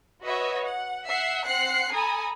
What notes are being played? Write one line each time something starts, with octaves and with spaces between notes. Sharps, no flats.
F#4 B4 C#5 D#5 E5
F#5
E5 F#5 C7
C4 F#5 F#6 C7 C#7
A4 G#5 A#5 B5 D#6